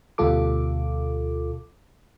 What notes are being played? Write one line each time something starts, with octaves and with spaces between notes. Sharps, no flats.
D2 B2 G3 F4 A4 D6